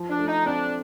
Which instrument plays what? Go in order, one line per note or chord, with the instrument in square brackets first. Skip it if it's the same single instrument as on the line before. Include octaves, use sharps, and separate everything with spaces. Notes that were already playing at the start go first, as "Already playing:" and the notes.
Already playing: [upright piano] F3
[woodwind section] D4
[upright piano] A3
[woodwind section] D#4
[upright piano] C4 [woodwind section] D4